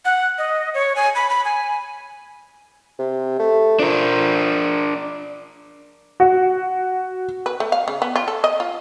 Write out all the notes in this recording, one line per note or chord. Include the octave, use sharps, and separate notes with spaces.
F#5
D#5
C#5
G#5
B5
B5
G#5
C3
A3
F3 D4 A#4
F#4
B4
A3
F5
C#3
B3
F4
A4
D#5
F4